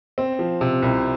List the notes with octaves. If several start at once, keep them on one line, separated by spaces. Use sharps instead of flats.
C4
F3
C3
C2